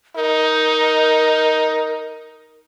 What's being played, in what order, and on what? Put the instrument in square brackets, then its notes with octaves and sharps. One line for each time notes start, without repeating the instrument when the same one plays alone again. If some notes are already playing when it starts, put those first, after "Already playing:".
[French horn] D#4 [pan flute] A#4